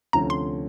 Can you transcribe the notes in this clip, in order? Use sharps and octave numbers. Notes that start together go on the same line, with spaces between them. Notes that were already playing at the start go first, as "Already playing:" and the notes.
D2 C3 F3 A3 C#4 A#5
C6